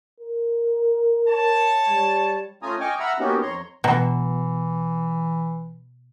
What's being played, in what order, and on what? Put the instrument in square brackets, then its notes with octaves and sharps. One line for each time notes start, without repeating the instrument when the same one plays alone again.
[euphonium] A#4
[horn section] C#5 A5
[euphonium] G3
[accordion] A3 C#4 F4 G#5 A#5 D#6
D#5 G5 G#5 C#6 D6 F6
E5 F#5 A#5 B5 E6 F6
A#3 B3 C#4 D#4 F#4 G4
F2 C#5 A#5 C6
[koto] B2 [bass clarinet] E3 [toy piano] F#5 G5 A#5